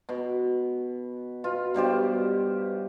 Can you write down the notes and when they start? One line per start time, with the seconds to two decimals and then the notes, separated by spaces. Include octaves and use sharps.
0.09 B2
1.44 B2 F4
1.74 G2 B2 G4 C5